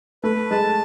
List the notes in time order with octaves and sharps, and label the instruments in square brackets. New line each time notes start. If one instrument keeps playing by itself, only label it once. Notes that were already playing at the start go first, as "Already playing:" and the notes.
[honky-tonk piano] A3 [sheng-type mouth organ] B4
[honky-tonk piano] G#3 [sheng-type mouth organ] A5